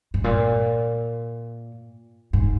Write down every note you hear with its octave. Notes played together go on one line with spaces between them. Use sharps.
G#2
A#2
G#2